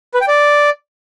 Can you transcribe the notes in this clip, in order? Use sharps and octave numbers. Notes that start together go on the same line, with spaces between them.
B4
G5
D5